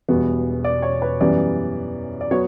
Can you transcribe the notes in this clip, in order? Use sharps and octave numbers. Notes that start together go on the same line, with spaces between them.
E1 E2 B2 G3 B3
D5
C#5
B4
F#2 E3 G3 B3 D5
D5
F#3 B3 C#5